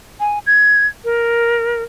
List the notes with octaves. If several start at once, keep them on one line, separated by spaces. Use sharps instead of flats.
G#5
G#6
A#4